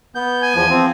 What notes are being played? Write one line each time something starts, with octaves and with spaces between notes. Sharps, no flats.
B3 G6
G#5
E2 F3
F3 C4